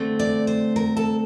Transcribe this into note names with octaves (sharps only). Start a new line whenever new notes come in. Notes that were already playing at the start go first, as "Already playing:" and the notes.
Already playing: D3 A3 C4
D5
C5
A#4
A4